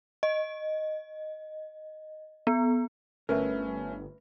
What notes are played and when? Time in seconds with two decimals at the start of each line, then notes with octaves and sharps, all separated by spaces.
0.23 D#5
2.47 B3
3.29 G1 A3 C#4 A#4 B4 E5